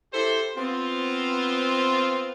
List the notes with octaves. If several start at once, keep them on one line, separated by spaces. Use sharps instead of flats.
E4 G4 A4 C5
B3 C4 F4